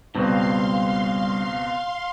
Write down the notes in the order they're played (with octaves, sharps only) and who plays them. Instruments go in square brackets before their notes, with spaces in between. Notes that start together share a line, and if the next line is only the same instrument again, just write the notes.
[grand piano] C#2 B2 C4 [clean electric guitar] G2 [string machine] F5 C6